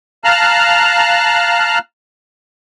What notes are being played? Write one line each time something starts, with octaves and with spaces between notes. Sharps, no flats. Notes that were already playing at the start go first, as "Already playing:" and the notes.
F5 A5 A#5 F6 F#6